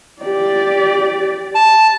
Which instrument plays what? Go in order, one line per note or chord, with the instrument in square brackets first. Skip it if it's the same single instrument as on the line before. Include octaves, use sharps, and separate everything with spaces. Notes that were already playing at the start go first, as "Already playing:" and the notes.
[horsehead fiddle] G4 D5
[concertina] A5